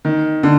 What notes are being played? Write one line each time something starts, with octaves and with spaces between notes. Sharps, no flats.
D#3
D3